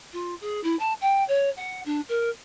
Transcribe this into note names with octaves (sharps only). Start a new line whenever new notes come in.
F4
G#4
E4
A5
G5
C#5
F#5
D4
A#4